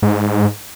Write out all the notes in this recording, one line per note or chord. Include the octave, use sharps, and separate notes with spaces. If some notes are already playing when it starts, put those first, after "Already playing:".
G#2